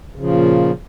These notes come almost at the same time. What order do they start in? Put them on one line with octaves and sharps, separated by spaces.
C#3 F3 A#2